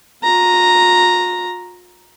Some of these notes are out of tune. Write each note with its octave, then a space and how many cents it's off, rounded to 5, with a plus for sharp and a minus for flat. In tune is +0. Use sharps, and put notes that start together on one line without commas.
F4 +45 A#5 +0